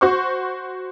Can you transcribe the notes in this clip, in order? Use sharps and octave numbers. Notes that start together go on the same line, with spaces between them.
F#4 C5 C#6